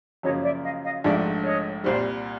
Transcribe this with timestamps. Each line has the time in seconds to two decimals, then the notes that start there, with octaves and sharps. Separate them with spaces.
0.23 F#2 C#3 F3 A#3 C#5 D#5
0.44 D5 E5
0.63 D#5 F5
0.83 D#5 F5
1.04 A#1 G#2 F3 A3 D4 D5 E5
1.45 C#5 D#5
1.84 C2 A#2 G3 C5 D5